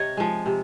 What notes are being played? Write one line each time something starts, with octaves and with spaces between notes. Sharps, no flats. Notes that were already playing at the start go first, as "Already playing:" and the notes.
Already playing: C3 C#5 D#5
F3 G#3
C3